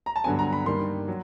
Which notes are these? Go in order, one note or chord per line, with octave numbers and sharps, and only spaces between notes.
A#5
A5
G2 D3 F#3 B3 G#5
A#5
B5
G2 D#3 G3 A#3 C6
F#3